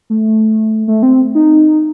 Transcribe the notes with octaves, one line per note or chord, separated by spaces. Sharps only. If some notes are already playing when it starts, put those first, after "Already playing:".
A3
A3
C4
D#4